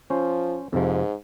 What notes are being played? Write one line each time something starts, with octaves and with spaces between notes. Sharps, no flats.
F3 C#4 C5
F2 G#2 C3 F3